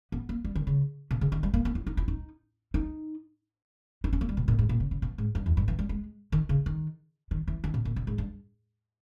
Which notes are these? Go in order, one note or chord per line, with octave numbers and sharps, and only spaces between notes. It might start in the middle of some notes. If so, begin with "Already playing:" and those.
B3
A#3
G3
D#3
C#3
B2
C#3
D#3
G3
A#3
B3
E4
D#4
E4
D#4
D#4
D#4
C#4
A#3
G3
B2
A#2
G#2
A#2
C#3
C#3
B2
G#2
G2
E2
G2
E3
G3
G#3
D#3
C#3
D#3
D#3
E3
D#3
B2
A#2
B2
G#2
G2